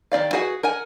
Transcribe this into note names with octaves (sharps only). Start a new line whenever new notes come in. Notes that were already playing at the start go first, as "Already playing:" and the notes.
D#3 D#4 D5 F5
F#4 G#4 B4 F#5
A#4 F#5 G#5